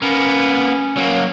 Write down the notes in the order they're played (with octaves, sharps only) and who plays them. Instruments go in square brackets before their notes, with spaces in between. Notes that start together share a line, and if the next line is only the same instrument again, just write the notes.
[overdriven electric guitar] A#3 B3 [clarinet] C#4
[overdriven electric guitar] F#3 A#3